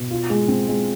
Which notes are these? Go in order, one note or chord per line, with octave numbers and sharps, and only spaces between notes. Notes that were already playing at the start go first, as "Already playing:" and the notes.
Already playing: B2
F4
G#3
C4
G#3